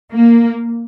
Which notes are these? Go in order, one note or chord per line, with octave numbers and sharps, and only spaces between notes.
A#3